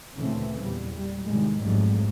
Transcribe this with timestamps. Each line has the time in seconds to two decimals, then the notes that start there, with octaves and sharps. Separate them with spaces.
0.16 D2 A#2 C#3 E3 A3 C4
0.62 E2 A#2 G3
0.95 G3
1.26 A2 C3 D#3 G3 G#3
1.60 A1 F2 G#2 F#3 G3 A3